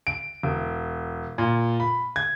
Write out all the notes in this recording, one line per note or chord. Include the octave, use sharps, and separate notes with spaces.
D7
E1
A#2
B5
G#6